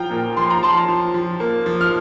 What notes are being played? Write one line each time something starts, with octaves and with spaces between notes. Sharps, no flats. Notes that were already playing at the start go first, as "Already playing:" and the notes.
Already playing: F3 F4 G5 A#5
A#2
F3 C6
A#5
F3 A5 C6
F3
F3
A#3
F3
F6